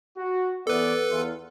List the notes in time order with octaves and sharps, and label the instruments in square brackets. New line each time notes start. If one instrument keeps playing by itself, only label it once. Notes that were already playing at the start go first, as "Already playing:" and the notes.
[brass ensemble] F#4
[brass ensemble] E3 B3 D5 [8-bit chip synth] A4 B4
[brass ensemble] E2 F4